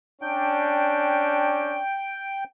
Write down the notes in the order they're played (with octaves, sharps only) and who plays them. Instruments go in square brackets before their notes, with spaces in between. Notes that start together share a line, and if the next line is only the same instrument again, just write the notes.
[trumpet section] C#4 D4 [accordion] G5